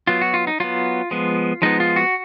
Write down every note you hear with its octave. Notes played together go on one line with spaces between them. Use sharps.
F#3 B3 F4
F#4
F4
D#4
F#3 B3 F4
F3 G#3 B3
F3 G#3 B3 D#4
F4
F#4